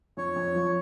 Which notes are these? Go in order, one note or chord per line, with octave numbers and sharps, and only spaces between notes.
F2 C#5
F2
F3